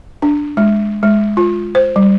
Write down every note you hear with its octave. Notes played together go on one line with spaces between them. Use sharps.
D4
G#3
G#3
F4
C5
G3